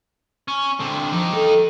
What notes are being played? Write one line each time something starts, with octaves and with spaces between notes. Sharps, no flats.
C#4
D3 C4
F3 D#4 G4
A4